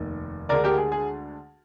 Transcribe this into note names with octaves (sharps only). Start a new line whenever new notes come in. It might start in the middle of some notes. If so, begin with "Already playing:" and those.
Already playing: F1 D#2 D#3
D2 D3 G#3 A#4 D5
G4 A#4
G#4
G#4